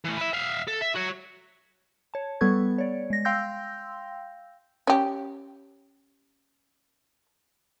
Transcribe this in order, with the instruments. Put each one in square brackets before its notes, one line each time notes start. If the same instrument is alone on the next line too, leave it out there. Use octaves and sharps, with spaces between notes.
[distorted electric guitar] E3 A3
B4 E5
E5 F5
A4
E5
F#4 C#5
[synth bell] C#5 A5
G3 B3 A4 B4 C#6 G#6
C#5 D5
G#3 A#6
F5 G5 C6 E6 G6 A#6
[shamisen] C#4 G4